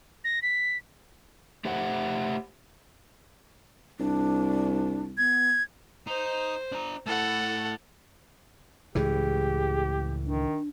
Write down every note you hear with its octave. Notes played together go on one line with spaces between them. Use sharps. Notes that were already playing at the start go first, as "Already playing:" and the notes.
A#6
B6
A3 G4 C5 E5 F#5
C2 D4
B3 G#6
D#4 C5
D4 A#5
A3 E4 A4 F#5
C#2 A2 E3 G4 G#4
D#3 D4